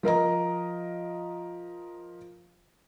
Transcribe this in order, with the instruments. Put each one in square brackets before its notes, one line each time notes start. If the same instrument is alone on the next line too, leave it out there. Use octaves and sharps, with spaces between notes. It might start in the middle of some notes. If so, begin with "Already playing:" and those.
[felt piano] F3 A#4 D#5 A#5